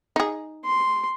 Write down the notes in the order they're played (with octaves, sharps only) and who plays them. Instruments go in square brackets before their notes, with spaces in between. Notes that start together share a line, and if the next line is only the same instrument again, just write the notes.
[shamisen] D#4 G#4
[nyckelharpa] C6